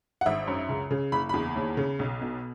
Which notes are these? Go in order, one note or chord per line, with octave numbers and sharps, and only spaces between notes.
F#5
G#1 E5
F#2
C#2
C#3
F#1 B5
E2 B5
D#2
C#3
B1
B2